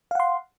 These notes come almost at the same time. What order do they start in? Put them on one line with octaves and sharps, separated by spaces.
F5 F#5 C6